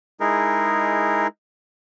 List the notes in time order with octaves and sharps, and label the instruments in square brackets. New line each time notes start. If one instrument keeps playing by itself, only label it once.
[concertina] G#3 D#4 E4 G#4 A#4